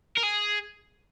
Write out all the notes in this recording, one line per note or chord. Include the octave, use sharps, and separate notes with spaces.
A#4
G#4